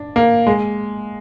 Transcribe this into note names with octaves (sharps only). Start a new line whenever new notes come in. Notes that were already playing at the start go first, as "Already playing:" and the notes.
Already playing: D4
A#3
G#3